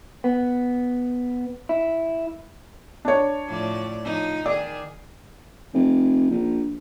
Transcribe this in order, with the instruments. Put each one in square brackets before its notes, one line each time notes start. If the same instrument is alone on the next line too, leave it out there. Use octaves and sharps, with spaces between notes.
[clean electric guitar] B3
E4
[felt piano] D4 C#5
[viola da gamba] A2 F3 D5
F3 D#4
[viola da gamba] D#3 G#4 [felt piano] D5
[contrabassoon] F1
A#1